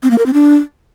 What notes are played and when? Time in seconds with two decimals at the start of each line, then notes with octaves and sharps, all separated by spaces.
0.03 C4
0.11 A#3
0.18 A#4
0.26 C4
0.34 D4